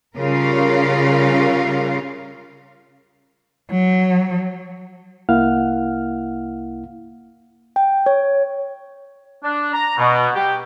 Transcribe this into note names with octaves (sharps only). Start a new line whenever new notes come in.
C#3 G3 C#4 F4 A#4 F5
F#3
C2 A#3 E4 F5 F#5 F6
G5
C#5
D4
A#5
B2
G4